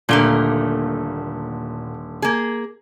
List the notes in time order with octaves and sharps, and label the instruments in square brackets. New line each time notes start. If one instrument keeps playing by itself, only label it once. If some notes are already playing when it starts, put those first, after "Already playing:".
[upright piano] D#1 D3 G7 [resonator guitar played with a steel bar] A#2 A3 A#3
[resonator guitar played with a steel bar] A#3 G#4